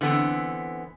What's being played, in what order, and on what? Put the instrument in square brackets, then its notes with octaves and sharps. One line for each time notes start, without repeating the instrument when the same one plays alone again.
[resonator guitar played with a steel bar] D3 E3 B3 C4